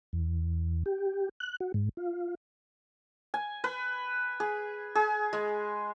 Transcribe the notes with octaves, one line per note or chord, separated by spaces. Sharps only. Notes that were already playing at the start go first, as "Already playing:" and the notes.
E2
G4
F#6
F#4
G#2
F4
G#5
B4
G#4
G#4
G#3